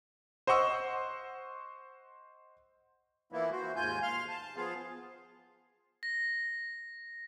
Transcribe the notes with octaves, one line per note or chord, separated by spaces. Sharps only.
C5 D#5 F#5 C#6 E6
E3 F3 A#3 B3 E4
F#4 C5
D#2 G#2 F4 G#5 G6
F5 C6 F6
A5
F3 B3 F4 G#4 F5
A#6